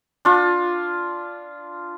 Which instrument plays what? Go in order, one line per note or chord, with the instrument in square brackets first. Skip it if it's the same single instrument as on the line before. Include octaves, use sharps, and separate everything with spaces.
[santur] D4 F4